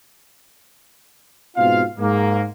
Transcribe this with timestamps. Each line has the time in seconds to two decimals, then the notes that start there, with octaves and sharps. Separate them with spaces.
1.56 G#2 B2 C4 F4 F5
1.99 G#2 A#3